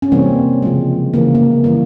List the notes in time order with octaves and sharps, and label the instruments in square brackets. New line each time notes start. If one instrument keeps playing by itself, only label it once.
[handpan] C#4
C3 E3 G3 A#3 C4
C#3 F3 G#3
C#3 E3 A#3
A#3
E3 G3 A#3